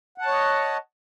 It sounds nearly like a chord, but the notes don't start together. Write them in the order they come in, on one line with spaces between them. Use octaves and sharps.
F#5 A5 C#5 D#5